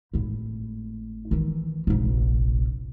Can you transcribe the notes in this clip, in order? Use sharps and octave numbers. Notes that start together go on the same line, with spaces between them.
G#1 A2
D#3 E3
F1 A#1